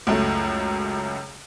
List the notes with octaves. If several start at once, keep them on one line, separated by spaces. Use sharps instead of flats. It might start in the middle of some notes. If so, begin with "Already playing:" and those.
C#2 F#2 A3